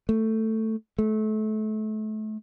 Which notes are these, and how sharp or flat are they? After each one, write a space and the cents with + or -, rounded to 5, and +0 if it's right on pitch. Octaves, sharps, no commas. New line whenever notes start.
A3 +10
A3 -30